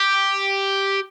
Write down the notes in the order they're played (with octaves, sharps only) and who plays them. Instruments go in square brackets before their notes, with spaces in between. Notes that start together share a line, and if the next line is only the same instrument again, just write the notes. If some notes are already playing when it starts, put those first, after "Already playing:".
Already playing: [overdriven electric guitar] G4